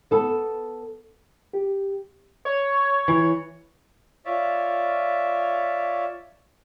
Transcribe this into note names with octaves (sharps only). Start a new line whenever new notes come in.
B3 A4
G4
C#5
E3
F4 C#5 D5 E5